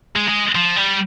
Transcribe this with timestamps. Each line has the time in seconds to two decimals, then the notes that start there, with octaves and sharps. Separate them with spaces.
0.16 G#3
0.28 G#3
0.55 F3
0.76 G3